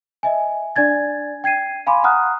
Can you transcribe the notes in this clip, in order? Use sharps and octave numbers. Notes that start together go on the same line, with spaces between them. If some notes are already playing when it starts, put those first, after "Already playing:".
D#5 E5 G#5
D4 D5 G#5 G#6 A6
G5 G#6 C7 D#7
F5 G#5 B5 C6 D6
F#5 A#5 D#6 F6 F#6